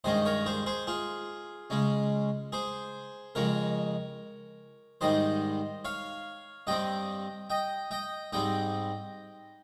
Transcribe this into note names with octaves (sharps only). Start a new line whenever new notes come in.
G2 D#3 G#3 C#4 C5 D#5
A#4 C#5
G#4 C5
G#4 C5
F4 G#4
C#3 G#3 C#4
G#4 C5
F2 C#3 G#3 A#4 C#5
G#2 D#3 G3 C5 D#5
C#5 F5
G2 G3 C4 D#5 G5
D#5 G5
D#5 G5
G#2 G3 C4 D#5 G5